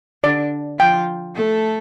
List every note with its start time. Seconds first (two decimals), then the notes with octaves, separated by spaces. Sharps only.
0.24 D3 D4 D5
0.79 F3 F4 G5
1.35 A3 A4